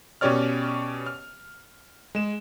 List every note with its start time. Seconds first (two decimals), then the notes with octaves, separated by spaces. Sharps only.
0.21 B2 C#4 G4 C#5 D5 F6
1.06 F6
2.15 G#3 E7